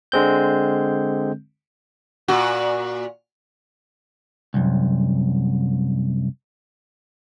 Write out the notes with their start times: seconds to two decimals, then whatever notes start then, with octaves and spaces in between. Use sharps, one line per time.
0.12 D3 G#3 C4 G6
2.28 A#2 F#4
4.54 C2 F#2